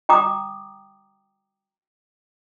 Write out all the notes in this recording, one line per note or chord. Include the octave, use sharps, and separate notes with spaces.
G5 A#5 D6 D#6